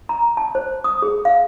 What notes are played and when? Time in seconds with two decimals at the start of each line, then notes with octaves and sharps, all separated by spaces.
0.09 A#5
0.37 A5
0.55 C5
0.84 D#6
1.02 G#4
1.25 F5